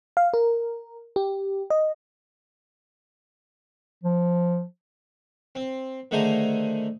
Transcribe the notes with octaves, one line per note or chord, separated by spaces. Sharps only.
F5
A#4
G4
D#5
F3
C4
D3 D#3 A3 G#4 C5 A#5